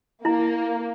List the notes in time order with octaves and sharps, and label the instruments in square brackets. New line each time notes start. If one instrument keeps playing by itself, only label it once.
[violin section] A#3 [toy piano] E4 A#5